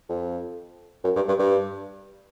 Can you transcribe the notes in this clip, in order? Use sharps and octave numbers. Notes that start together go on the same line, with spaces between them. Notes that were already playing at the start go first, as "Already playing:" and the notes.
F2
F#2
G2
G2
G2